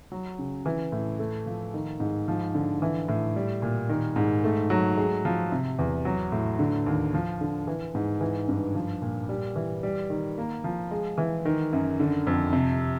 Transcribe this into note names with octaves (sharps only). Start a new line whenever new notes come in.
F#3
C#3
E3
A2
A3
F3
D#3
G#2
F3
D3
E3
A2
G3
A#2
D#3
G#2
A3
F#3
G#3
F3
C3
E2
F#3
A2
D3
D#2
F3
D3
E3
G#2
E3
G2
F3
A#2
G3
E3
G3
D#3
A#3
F3
G#3
E3
D#3
F#2
D3
F2
C3